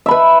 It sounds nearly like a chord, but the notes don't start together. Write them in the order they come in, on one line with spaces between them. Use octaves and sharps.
E5 B5 B4